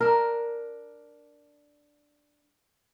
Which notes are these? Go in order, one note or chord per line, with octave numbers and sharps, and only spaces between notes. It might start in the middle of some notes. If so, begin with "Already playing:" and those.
D4 A#4